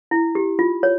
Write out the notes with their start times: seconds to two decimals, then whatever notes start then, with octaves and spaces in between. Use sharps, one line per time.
0.11 E4
0.35 G4
0.59 F4
0.83 C#5